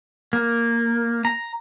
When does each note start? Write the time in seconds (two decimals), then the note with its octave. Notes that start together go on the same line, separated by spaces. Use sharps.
0.33 A#3
1.25 A#5